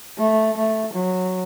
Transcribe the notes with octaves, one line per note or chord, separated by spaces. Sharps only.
A3
A3
F#3